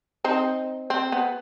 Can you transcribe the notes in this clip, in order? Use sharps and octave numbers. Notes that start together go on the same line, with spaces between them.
C4 D#4
C4
B3